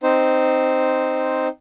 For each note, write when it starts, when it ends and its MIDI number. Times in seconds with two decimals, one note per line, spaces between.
0.03 1.48 60
0.03 1.48 63
0.03 1.48 72